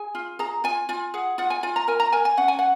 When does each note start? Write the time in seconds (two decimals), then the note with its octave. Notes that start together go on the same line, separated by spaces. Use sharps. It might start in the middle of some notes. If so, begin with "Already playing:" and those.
Already playing: G#4 G#5
0.15 F4
0.39 G#4 A#5
0.64 F4 G#5
0.89 F4 G#5
1.14 G#4 F#5
1.38 F4 F#5
1.50 G#5
1.63 F4 G#5
1.76 A#5
1.88 A#4 G#5
2.00 A#5
2.12 A#4 G#5
2.25 G#5
2.37 C#4 F#5
2.48 G#5
2.59 F#5